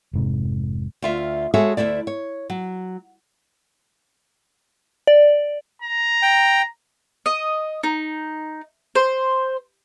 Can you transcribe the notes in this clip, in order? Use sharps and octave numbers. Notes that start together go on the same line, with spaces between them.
F1 G#2 C3
D2 F4 E5
G#3 F#4 G#4 A4 C#5 E5
D2 C#3 A3 E4 D5
C#5
F#3
D5
A#5
G5
D#5
D#4
C5